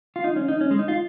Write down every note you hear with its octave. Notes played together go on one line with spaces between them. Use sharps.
F4
D#4
C#4
D#4
C#4
G#3
D#4
F4